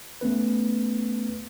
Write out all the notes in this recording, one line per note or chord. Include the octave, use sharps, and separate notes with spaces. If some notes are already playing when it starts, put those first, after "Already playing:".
A3 B3 C#4 B4